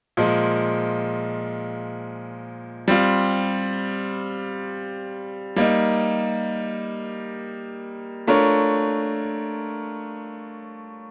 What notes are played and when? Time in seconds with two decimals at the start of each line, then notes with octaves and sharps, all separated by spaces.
0.17 A#2 F3 G#3
2.88 G3 C4 F4
5.56 G3 A#3 D#4
8.27 A3 D4 F4 A#4 C#5